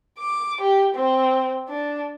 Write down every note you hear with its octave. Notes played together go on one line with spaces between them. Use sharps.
D6
G4
C4
D4